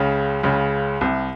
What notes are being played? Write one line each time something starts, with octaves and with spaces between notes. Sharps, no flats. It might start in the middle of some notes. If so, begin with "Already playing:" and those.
Already playing: C#2 C#3
C#2 C#3
C2 C3